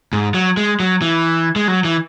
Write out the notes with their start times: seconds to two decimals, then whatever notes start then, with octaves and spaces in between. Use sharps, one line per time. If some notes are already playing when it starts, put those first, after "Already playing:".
0.13 G#2
0.34 F#3
0.57 G#3
0.80 F#3
1.02 E3
1.56 G#3
1.68 F#3
1.84 E3